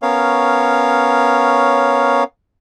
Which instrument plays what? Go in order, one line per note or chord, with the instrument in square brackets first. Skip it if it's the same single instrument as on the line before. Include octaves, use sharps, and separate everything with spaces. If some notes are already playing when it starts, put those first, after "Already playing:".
[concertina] B3 C#4 A#4 C#5 F5